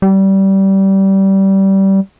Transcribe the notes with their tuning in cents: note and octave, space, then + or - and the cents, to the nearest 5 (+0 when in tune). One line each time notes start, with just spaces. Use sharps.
G3 -20